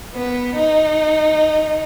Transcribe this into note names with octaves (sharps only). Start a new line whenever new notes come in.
B3
D#4